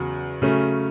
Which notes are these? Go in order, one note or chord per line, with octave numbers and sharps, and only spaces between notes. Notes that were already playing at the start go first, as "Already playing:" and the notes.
Already playing: E2 C#3 F#3
C#3 F#3 A3 C#4